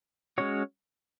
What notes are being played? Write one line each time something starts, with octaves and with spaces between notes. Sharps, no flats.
G#3 C#4 F#4 C#5